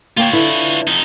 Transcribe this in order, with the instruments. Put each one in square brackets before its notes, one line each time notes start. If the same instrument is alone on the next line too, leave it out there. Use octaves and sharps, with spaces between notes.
[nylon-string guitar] A#3 G5 [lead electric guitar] F4 C#5
[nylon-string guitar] D3 E4 B4
[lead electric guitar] F2 D#4